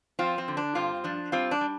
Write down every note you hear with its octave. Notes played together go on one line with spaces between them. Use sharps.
F3 C4 F4
C4
D3
D4
G2 C4 F4
F3 D4
G3 C4 F4
D4
G3